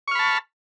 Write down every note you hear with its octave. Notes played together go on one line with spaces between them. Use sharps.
A5 B5 C#6 F6